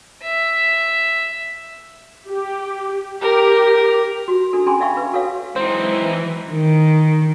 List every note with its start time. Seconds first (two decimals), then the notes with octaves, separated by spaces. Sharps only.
0.23 E5
2.29 G4
3.21 G4 A#4
4.28 F#4
4.53 D4 F#4 A4
4.66 C#4 D4 G#4 G#5 B5 C6
4.80 D5 E5 F5 G5 B5 C#6
4.97 B4
5.13 F#4 A4 C#5 F5
5.56 E3 F#3 G#3 C4 D#4 E4 C5
6.51 D#3